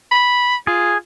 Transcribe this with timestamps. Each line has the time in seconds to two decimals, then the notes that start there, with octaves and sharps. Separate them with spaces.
0.11 B5
0.67 F4 G#4